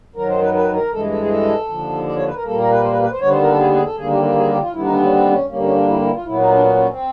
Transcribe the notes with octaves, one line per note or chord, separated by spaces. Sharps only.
F#2 D#3 F#3 A#4
C5
B4
B4
A#4
G2 E3 G#3 A4
A4
G#4
A4
D#2 D3 F3
D5
C#5
B4
A#4
A#2 G3 A#3 A4
A#4
B4
C5
B4
B4
C5
D#2 D3 G3 B3 C#5
C5
A#4
A4
G#4
G#4
A4
D#2 D3 G3 A#3 G#4
G4
G4
G#4
G4
F4
D#2 D3 G3 B3 E4
D#4
D4
C#4
C4
C#4
G2 D3 G3 A#3 C#4
C#4
D4
E4
E4
F4
A#2 F#3 B3 E4
D#4
D4
C#4
C#4
C4